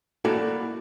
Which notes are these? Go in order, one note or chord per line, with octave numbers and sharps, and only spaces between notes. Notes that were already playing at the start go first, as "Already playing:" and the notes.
A#3 E4 F#4 A4 D5 F5